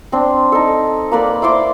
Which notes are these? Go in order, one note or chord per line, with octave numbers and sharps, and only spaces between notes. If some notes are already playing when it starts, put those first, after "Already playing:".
C4 D4
D#4 A4
A#3 B4 D5
E4 C5 D5 D6